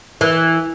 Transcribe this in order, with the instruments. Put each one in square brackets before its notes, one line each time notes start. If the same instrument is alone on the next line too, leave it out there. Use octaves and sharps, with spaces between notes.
[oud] E3